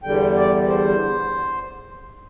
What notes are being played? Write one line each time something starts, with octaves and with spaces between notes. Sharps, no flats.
E2 D3 G3 G5
D5
C5